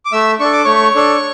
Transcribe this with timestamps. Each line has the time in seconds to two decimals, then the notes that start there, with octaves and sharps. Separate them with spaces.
0.05 D6
0.12 A3 E5 E6
0.40 D4 A4 C#6
0.53 D6
0.64 A3 C#5 C#6
0.95 D4 A4